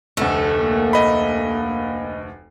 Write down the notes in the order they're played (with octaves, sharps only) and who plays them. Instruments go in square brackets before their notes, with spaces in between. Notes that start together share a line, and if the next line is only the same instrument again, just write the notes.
[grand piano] F1 D2 [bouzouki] A3
[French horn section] A#3
[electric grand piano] D#5 B5